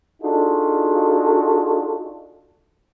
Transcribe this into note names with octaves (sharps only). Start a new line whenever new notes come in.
D4 D#4 F4 F#4 G#4 A4